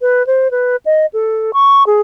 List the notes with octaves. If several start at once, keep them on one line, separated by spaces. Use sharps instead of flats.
B4
C5
B4
D#5
A4
C#6
G#4